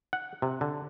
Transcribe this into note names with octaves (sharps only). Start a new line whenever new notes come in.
F#5
C3
D3